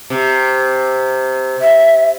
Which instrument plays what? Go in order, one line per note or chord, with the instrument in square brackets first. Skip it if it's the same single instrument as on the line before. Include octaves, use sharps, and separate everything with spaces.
[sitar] C3
[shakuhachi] E5